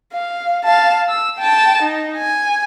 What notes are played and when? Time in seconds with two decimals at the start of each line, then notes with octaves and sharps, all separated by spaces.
0.13 F5
0.64 F5 A5
1.09 E6
1.39 G5 A5
1.82 D#4
2.17 G#5